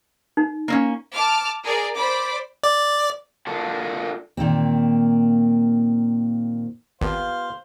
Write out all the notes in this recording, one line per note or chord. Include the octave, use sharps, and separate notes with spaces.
D#4
A#3 C4 C#4
A5 D6 F6
G#4 A#4 D5
C5 D5 B5 D6
D5
D4 F4 F#4 A4 A#4
A#2 D#3 A#3 C4
G#1 B3 F4 G4 C5 F5